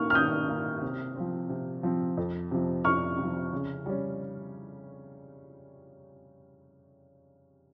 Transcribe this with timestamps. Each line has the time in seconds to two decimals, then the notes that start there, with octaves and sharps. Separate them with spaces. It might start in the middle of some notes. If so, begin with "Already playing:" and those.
Already playing: D#3 A#3 D#4 C#6 F6
0.10 F6
0.14 D#3 D#6 G6
0.48 A#3 D#4
0.82 C3
1.15 F3 C4
1.49 C3
1.83 F3 C4
2.17 F2
2.51 C3 F3
2.84 F2 C#6 F6
3.18 C3 F3
3.52 C#3
3.86 G3 C#4